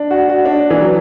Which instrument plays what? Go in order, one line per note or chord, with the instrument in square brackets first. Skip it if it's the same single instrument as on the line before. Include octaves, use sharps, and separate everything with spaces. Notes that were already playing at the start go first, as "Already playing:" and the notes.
Already playing: [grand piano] D4
F#4
F#4
D4
E3
F#3